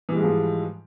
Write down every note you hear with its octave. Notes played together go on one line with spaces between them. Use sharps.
G#2 E3 F3 G3 G#3